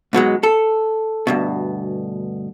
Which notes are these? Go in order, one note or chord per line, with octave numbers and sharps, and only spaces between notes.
G#2 B2 F#3 G#3
A4
D2 G2 B2